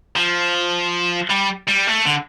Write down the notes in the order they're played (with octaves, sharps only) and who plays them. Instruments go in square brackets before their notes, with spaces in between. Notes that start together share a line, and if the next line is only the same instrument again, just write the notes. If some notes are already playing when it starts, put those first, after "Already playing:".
[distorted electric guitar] F3
G3
G3
A3
D3